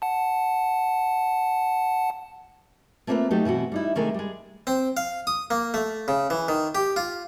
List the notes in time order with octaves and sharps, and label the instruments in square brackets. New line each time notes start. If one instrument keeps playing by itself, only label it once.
[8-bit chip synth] F#5 A5
[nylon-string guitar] A3 A#3 C4 D#4 F4 B4
F#3 A3 D#4 G4
B2 E3 C4 F#4
G3 D#4 E4
C3 D#3 G#3 A3 A#4 E5
G3 G#3
[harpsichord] C4
F5
D#6
A#3
A3
C#3
E3
D#3
G4
F4